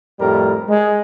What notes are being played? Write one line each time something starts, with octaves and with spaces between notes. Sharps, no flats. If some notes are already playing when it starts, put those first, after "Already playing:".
F2 A2 G3 G4 A#4
G#3